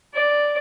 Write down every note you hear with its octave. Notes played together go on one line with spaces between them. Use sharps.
D5